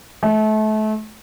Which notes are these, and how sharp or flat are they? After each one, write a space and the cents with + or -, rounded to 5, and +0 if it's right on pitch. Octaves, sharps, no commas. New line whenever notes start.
A3 -30